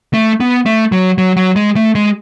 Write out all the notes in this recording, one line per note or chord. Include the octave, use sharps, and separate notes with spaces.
A3
B3
A3
F#3
F#3
F#3
G#3
A3
G#3